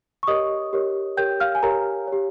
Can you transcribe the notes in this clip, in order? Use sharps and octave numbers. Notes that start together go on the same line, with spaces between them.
C#6
G4 A#4 C#5 D#5 D#6
G4 A#4 C#5
G4 A#4 C#5 G5 G6
F5 F6
G#5
G4 A#4 C#5 A#5
G4 C#5